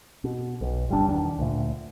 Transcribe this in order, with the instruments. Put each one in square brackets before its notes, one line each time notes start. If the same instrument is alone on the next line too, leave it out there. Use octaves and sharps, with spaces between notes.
[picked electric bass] B2
B1
G1 G3 D4
E1 E2 D#3 D4
D2 A#2